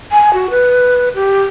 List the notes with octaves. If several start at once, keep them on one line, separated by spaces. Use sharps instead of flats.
G#5
F#4
B4
G4